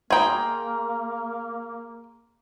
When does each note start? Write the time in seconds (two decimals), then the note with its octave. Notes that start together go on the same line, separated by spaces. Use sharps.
0.10 A#3 G#4 G5 A#5 C6